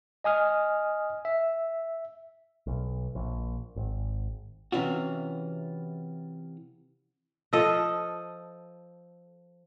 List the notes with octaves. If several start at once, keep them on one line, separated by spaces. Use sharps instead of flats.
D#5 G#5 D#6 F6
E5
B1
A#1
G#1
C3 E3 C#4 F4 F#4
F3 A4 D#5